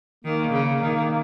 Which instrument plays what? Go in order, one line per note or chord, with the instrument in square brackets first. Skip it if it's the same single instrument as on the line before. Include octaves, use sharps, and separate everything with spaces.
[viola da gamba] D#3 [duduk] A#3
[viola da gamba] C#3
D#3